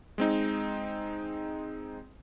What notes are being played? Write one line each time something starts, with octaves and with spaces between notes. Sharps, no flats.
G#3 C4 D#4